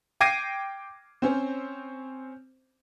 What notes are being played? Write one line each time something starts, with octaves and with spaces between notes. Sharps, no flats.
G5 D6 G#6 A#6 C7 D#7
C4 C#4 C5